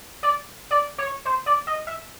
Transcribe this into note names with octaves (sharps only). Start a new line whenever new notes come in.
D5
D5
C#5
C5
D5
D#5
E5